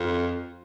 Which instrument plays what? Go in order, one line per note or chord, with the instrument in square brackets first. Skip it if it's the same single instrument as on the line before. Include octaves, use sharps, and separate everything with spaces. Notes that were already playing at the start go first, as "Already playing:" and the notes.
Already playing: [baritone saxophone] F2